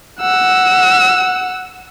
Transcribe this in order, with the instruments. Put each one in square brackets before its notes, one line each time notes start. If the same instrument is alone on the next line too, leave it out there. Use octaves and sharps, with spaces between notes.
[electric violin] F#5 E6